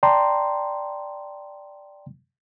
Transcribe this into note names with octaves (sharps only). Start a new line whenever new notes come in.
D5 G5 A5 A#5 C6